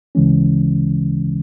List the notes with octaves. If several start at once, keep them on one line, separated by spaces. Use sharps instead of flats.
D2 C#3 E3 G#3 C#4